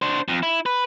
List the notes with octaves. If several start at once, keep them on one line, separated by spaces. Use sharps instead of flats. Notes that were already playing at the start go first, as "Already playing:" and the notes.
D4 C5
F2
E4
B4